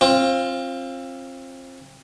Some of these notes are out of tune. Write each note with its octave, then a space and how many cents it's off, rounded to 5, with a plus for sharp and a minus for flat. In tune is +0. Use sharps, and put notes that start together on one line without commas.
C4 +30 F4 +0